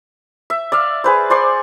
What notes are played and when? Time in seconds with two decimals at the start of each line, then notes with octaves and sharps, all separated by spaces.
0.50 E5
0.72 D5 E5 F5
1.04 G#4 B4 C5
1.30 C5 D5 C6 C#6